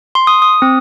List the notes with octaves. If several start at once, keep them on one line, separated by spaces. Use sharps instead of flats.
C6
D#6
D#6
C4